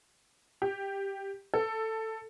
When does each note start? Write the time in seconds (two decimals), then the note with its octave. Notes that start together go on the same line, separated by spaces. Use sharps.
0.62 G4
1.54 A4